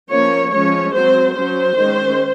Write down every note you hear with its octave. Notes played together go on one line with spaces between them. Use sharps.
F3 A#3 C#4 C#5
F3 G#3 C#4 C#5
F#3 C4 C5
F#3 C#4 C5
D#3 G#3 C#4